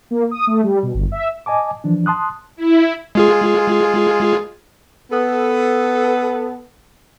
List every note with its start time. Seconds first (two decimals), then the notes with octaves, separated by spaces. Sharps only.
0.11 A#3
0.31 D#6
0.47 A3
0.64 G3
0.83 B2
0.94 G1
1.12 E5
1.46 D#5 G#5 A5 D6
1.84 E3 F3 D4
2.06 A5 C6 D#6 F#6
2.56 E4
3.15 G#3 F4 G#4
5.11 B3 A4